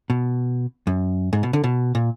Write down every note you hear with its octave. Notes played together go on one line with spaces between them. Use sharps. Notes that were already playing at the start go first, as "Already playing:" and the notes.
B2
F#2
G#2
B2
D3
B2
A#2